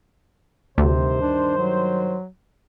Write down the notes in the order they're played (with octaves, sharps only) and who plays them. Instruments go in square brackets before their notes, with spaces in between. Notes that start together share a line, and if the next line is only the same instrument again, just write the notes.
[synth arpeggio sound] D2 [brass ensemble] G2 D#3 C5 [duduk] C3
[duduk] D4
F#3